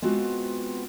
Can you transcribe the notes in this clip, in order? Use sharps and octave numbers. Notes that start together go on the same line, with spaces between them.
G#3 B3 C4 F4 F#4